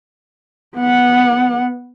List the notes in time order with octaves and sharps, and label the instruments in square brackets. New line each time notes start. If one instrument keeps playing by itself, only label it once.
[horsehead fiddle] B3 F#5